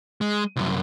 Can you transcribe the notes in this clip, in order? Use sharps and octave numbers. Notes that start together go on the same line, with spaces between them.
G#3
C2 F#2